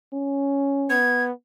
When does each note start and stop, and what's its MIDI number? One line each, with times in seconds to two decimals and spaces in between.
0.13 0.98 61
0.90 1.32 59
0.90 1.23 92